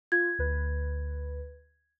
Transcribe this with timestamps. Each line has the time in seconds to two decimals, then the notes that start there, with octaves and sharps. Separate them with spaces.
0.12 F4 G#6
0.38 D2 B4